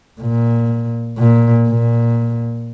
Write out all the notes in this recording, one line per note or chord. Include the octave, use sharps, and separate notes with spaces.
A#2
A#2
A#2